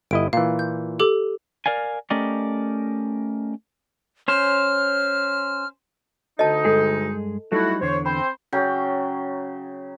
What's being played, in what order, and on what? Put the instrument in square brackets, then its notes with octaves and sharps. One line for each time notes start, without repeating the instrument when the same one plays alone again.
[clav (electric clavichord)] G1 E4 D#5 [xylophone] D7
[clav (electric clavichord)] A#2 E3 [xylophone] F5
[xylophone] G6
G4 A4 D6
[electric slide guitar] A#4 D5 F5 G#5
A3 C#4 G4 A#4 D5 D#5
[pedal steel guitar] C#4 C5 [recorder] F6
[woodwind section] D2 D3 D#4 [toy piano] D#5 A5
[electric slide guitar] G2 G#3 G#4 [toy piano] A4
[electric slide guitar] F#3 G3 D#4 [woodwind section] A3 E4 F#4
[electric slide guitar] E2 D3 [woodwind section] C5 C#5
[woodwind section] C4 C5 [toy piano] B5
[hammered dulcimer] C#3 F#3 G5